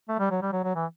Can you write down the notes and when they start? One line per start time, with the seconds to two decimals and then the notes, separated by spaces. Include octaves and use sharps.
0.09 A3
0.19 G3
0.31 F#3
0.42 G3
0.53 F#3
0.64 F#3
0.75 E3